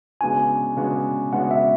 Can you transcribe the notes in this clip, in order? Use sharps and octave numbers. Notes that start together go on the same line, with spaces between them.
C#3 G#3 B3 D4 F#4 G#5
C#3 G#3 B3 D4 F#4
C#3 G#3 B3 D4 F#4 F#5
E5